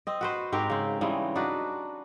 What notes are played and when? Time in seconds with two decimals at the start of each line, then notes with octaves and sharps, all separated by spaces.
0.07 C4 D#5
0.21 F#4 B4 C5
0.52 G#2 C4 G4 A#4
0.70 C#3 C4
1.01 C#3 E3 G3 G#3
1.35 D4 D#4 F#4 B4